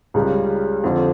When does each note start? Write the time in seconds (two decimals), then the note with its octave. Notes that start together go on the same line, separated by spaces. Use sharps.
0.14 C#2 C#3 G3
0.84 F2 D3 F3